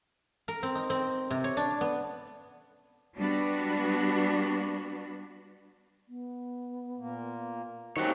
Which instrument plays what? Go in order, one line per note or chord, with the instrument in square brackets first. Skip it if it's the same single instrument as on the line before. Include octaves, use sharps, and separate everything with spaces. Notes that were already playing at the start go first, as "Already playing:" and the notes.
[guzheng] A#4
C4
D#4
C4
C3
C#5
D4
B3
[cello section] G3 B3 D4 F#4
[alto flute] B3
[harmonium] A#2 A#3
[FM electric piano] D#3 C4 [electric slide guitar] A3 F#4 C#5 [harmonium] A#3 C#4 G4